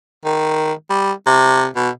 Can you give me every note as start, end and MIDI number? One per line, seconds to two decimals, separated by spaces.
0.25 0.73 51
0.90 1.12 55
1.26 1.67 48
1.76 1.90 47